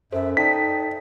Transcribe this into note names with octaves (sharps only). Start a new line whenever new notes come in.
F#2 A4 C5 E5
D#4 A4 D5 G5 A5 B6